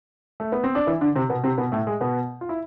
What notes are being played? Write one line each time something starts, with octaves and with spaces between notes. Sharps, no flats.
A3
B3
C4
D4
E3 E4
D3 D4
C3 C4
B2 B3
C3 C4
B2 B3
A2 A3
G#3
B2 B3
F4
E4